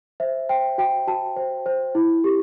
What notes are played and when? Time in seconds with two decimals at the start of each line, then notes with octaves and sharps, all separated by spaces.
0.20 C5 E5
0.49 C5 G5
0.78 F#4 G5
1.08 F#4 A5
1.36 C5
1.66 C5
1.95 E4
2.24 G4